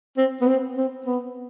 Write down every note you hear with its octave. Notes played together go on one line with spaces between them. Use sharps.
C4
B3
C4
C4
B3